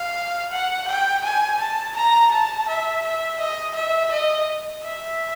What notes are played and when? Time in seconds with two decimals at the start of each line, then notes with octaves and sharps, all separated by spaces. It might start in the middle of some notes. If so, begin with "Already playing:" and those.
Already playing: F5
0.52 F#5
0.88 G5
1.24 G#5
1.60 A5
1.96 A#5
2.31 A5
2.68 E5
3.04 E5
3.40 D#5
3.75 E5
4.11 D#5
4.83 E5